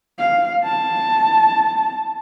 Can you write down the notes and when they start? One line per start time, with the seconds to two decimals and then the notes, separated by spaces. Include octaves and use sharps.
0.19 F5
0.64 A5